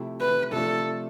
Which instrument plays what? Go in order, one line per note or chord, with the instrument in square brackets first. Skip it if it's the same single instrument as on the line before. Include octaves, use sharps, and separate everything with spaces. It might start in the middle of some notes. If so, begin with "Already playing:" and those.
Already playing: [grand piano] C3 F3 A3 E4 G4
[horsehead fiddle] B4
[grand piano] C3 F3 A3 D4 F4 [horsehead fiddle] A4